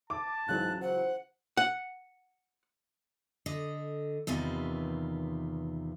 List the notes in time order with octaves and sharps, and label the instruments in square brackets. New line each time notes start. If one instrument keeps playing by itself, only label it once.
[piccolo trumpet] A5 [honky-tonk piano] D6
[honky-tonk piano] C#2 E3 F#3 [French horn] G#2 [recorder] F#6
[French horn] C5 [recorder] F#5
[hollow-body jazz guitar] F#5
[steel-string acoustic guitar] D3 D#5
E2 C3 D#3 F4 B4